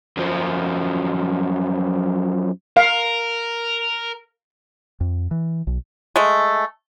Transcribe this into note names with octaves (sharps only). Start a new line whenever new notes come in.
F#2 F3
A#4 F5
F2
E3
B1
G#3 A3